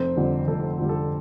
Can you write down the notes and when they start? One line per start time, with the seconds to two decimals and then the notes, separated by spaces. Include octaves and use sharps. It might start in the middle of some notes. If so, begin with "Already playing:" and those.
Already playing: F1 C4 C5
0.17 F2 D3 G3
0.47 F1 A4
0.79 F2 D3 G3
0.89 A4